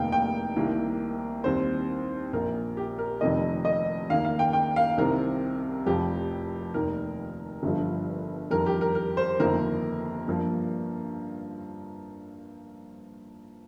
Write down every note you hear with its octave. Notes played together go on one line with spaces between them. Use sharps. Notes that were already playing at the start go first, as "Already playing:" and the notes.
Already playing: F1 D#2 D#3 G3 A#3 F5 G5
G5
C2 C3 D#3 A#3
D#2 D#3 G3 C4 C5
A#1 A#2 A#3 A#4
G4
A#4
F1 F2 C3 D#3 D#5
D#5
D#2 D#3 A#3 F5
F5
G5
G5
F5
C2 C3 D#3 C4 A#4
F1 F2 F3 G4
F1 D#2 D#3 A#4
G1 G2 F3
F2 D#3 G3 A#4
G4
A#4
A#4
C5
G1 F2 D#3 A#3 A#4
G2 F3 A#3